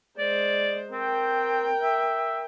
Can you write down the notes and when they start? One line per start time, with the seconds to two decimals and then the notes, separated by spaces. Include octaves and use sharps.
0.18 G#3 C5 D5
0.92 C4 A#4 G5
1.83 E5